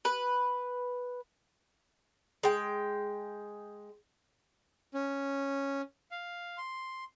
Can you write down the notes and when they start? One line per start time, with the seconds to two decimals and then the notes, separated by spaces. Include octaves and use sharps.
0.05 B4
2.43 G#3 G5
4.94 C#4
6.11 F5
6.57 C6